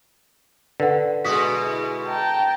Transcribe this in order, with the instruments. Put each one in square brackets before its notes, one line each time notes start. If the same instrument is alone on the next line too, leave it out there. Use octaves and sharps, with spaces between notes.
[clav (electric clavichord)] D3 [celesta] B4 F#5
[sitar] B2 G#3 F#4 [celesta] D#6 B6
[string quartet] E4
G5 A5 A#5